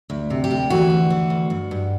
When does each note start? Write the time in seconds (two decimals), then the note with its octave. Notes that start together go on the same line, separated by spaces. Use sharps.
0.10 D2
0.30 C3
0.44 G4
0.51 D2
0.70 E3 F#4
0.90 D2
1.10 E3
1.30 D2
1.50 G2
1.71 G2